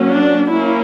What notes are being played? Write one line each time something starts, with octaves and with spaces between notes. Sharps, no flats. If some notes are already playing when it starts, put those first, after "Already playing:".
Already playing: F#3 A#3 C#4
D4
A#3 C#4 E4